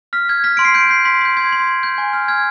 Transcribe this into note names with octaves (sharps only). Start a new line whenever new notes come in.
F6 B6
F6 G#6
F6 B6
C6 D7
C7
G6 D7
G6 C7
C6 B6
C6 G6
C6 G#6
C6
C6
G6
G#5
F6
F6 G#6